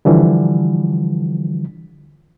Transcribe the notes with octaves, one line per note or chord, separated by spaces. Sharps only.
D3 E3 F3 G3